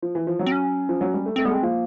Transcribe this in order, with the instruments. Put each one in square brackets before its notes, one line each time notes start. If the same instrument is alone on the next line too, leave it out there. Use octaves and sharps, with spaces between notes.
[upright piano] F3
E3
F3
F#3
[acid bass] C4
C#4
[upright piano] F3
F#3
G3
A3
[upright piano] A3 [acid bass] C4
[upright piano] G3 [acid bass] B3
[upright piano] G#3 [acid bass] C4
[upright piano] F3 [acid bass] A#3